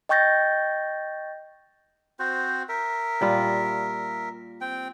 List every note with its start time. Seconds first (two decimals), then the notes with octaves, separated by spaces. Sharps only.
0.09 D#5 G5 C#6 G6 A6 A#6
2.19 C4 F#4 C5
2.69 A#4 E5
3.21 A#2 G3 F4
4.61 C4 G5